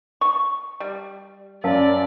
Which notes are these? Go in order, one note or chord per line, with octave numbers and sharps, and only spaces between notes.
C#6
G3
F#2 A#4 D5 F5 A5